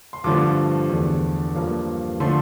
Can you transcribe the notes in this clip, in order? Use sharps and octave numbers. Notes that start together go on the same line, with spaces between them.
C6
G2 D3 F3 A3 D6
E2 D3 A3
G2 F3 A#3
D3 F3 A3 C6